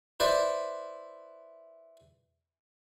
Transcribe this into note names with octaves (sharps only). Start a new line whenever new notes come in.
E4 B4 C5 D5